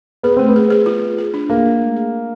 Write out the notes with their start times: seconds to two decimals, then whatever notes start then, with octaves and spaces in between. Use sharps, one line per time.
0.23 B3 G#4
0.37 A3 C4
0.48 B3
0.56 G#4
0.71 G#4
0.86 F4
1.02 F4
1.18 G#4
1.34 D4
1.50 A#3 G#4
1.66 D4
1.81 A3
1.96 G#4
2.13 D4